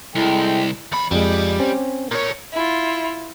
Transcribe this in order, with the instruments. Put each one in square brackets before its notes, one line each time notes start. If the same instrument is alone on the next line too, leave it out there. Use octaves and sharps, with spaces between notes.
[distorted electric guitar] C2 [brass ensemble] G#3 A4 G5 [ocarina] E4
[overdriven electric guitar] E2 B5
[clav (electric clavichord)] F2 G#3 [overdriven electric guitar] G3
[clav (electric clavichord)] C4 C#4
[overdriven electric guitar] A#2 C#5 [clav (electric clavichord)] A#4
[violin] E4 F4